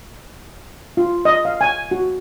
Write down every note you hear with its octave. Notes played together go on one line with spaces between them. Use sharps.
F4
D#5
F5
G#5
F#4